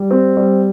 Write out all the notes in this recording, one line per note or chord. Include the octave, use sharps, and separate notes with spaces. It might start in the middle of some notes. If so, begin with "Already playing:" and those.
Already playing: G3
C4
G3